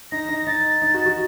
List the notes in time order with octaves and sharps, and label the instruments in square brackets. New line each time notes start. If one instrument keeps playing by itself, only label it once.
[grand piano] D#4 [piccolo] A#6
[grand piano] D#4
[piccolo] A#6
[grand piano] D#4 [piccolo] A6
[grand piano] D#4
F#4
F#4